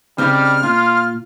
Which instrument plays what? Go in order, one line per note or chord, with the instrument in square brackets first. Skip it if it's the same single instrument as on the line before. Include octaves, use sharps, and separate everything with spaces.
[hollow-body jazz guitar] C#3 C4 D#4 [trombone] G3 [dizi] F6
[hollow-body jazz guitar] A#2 [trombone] F4